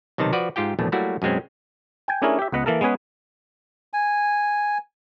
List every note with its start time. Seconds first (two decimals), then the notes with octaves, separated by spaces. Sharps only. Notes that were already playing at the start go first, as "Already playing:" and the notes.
0.18 B1 C3 D#3 D#4 A5
0.33 F3 F#4 B4 D5
0.56 G#2 F4 G4 G5
0.79 A#1 E2 B2 A3
0.92 F#3 G3 A3 A#3 E4 F#4
1.22 F#2 B2 G#3 C4 C#4
2.08 G5 G#5
2.22 A3 C#4 D4 E4 G#4 A#4
2.39 G4 E5
2.52 C#2 B3 B4 D#5 F#5
2.66 E3 A#3 A4 A#4
2.81 G#3 B3 C#4 G#4 B4
3.93 G#5